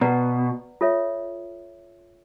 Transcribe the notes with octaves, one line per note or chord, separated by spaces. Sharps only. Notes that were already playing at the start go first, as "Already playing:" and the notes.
B2 B4 D5 F#5 A#5
F4 A4 C#5 E5